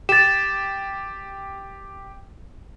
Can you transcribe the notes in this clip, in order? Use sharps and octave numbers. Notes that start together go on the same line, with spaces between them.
G4 A6 E7